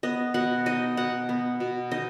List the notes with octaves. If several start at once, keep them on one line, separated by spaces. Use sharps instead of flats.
B3 D#5
B2 F#5
D#4 D#5
B2 F#5
B3
B2
D#4 D#5